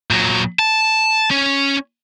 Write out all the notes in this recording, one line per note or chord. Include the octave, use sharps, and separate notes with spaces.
A#2 F#3
A5
C#4